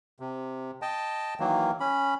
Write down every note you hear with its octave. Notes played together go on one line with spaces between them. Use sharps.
C3
D#5 G5 A5
D#3 E3 F#3 A#3
C#4 B5